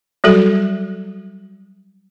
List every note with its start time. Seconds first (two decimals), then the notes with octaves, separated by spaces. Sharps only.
0.24 F#3 G3 F#4 A4